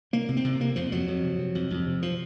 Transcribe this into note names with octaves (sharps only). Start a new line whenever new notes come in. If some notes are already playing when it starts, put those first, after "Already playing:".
C3 A#3
C3
C4
C3
C3 A#3
F2 F3
F2 F#3
F2
C3
C3
F2
F2
C3
F3